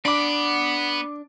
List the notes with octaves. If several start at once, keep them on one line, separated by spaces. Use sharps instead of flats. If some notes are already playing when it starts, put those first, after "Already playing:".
B3 D4 B5 D6 D7